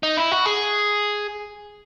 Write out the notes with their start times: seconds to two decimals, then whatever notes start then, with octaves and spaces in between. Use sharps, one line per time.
0.03 D#4
0.17 E4
0.31 F#4
0.46 G#4